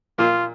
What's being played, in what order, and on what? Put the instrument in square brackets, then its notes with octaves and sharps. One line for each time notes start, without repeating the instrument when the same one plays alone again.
[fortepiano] A#2 A#3 [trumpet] F4